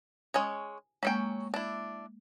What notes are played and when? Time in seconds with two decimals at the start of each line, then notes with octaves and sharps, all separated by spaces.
0.34 G#3 C#4 C#5 G#5 D#6
1.03 F#3 G#3 A#3 C#4 G5
1.54 D4 E4